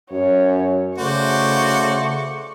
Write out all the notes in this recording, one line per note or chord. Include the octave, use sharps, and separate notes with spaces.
F#2 C#5
C#3 A3 F#4 C5 D5 C#6